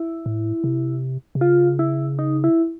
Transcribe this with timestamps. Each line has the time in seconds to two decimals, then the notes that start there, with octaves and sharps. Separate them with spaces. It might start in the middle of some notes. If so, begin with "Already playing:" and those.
Already playing: E4
0.26 A2
0.64 C3
1.35 C3
1.41 C#3 F4
1.79 E4
2.19 D#4
2.44 E4